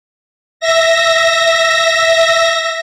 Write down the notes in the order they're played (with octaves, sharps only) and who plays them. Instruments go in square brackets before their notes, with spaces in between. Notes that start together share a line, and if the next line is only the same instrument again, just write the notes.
[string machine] E5 A#6